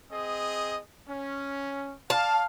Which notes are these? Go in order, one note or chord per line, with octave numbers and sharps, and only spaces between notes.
C4 G#4 D#5
C#4
D5 F5 A5